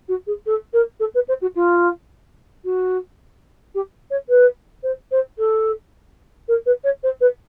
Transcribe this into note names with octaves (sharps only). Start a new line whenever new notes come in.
F#4
G#4
A4
A#4
A4
B4
C5
F#4
F4
F#4
G4
C#5
B4
C5
C5
A4
A#4
B4
C#5
C5
B4